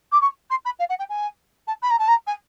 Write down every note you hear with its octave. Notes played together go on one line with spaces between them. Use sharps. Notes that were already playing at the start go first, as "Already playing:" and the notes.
D6
C#6
C6
B5
F5
F#5
G5
G#5
A5
B5
A#5
A5
A#5
G#5